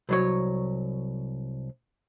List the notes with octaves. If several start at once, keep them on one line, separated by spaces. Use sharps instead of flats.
C2 F#3 C#5